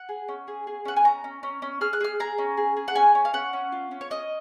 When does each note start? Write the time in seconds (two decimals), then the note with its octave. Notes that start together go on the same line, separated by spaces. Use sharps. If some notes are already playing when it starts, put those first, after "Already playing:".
Already playing: F#5
0.09 G#4
0.28 C#4
0.48 G#4
0.67 G#4
0.85 C#4 F#5
0.96 G#5
1.05 C#4 A#5
1.24 C#4
1.43 C#4
1.62 C#4
1.81 G#4 F6
1.93 F#6
2.01 G#4 F6
2.20 G#4 A#5
2.38 C#4
2.57 G#4
2.77 G#4
2.88 F#5
2.96 C#4 G#5
3.15 C#4
3.25 F5
3.33 C#4 F#5
3.53 C#4
3.72 F4
3.91 C#4
4.01 C#5
4.10 C#4 D#5